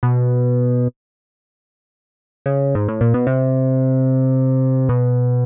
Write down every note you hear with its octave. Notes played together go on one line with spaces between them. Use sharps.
B2
C#3
G#2
A2
A#2
B2
C3
B2